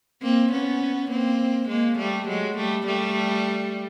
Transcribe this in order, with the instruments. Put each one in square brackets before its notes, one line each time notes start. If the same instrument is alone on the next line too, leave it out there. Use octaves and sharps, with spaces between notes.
[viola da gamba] A#3 C4
B3 C#4
A#3 C4
G#3 A#3
G3 A3
F#3 G#3
G3 A3
G3 A3